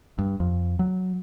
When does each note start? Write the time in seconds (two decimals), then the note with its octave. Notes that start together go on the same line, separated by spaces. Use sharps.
0.19 G2
0.40 F2
0.79 F#3